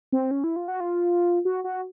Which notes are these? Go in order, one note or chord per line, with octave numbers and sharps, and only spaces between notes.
C4
C#4
E4
F4
F#4
F4
F#4
F#4